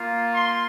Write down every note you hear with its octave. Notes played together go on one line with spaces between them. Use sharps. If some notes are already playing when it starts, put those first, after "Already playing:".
Already playing: A#3 F4
C6